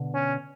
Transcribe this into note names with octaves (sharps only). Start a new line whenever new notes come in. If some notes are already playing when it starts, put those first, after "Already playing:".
Already playing: B2 D3
C#4